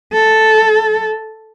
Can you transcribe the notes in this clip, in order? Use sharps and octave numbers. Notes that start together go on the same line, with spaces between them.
A4